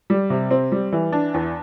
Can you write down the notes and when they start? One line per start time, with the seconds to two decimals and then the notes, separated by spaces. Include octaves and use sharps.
0.10 G3
0.30 C3
0.51 C4
0.72 G3
0.92 E3
1.12 D4
1.34 E2